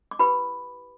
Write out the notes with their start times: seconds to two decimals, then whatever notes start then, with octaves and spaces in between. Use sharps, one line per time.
0.11 D6
0.19 E4 G4 B4 B5